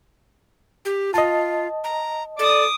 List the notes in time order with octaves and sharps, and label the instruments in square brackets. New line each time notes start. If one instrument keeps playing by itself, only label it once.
[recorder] G4
[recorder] F4 [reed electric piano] D#5 A5
[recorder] A#5
[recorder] A4 [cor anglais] D5 [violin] D6 D#6